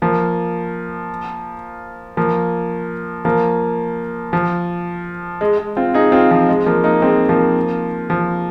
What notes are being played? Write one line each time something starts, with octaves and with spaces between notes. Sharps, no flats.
F3 A#3
F3 A#3
F3 A#3
F3
G#3
G#3
C4 F4
D#4 G#4
C4 F4
F3
G#3
F3 A#3
A#3 D#4
G#3 C4
F3 A#3
F3